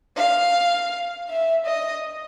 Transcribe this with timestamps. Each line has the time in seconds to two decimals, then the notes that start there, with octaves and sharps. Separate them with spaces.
0.17 F5
1.29 E5
1.66 D#5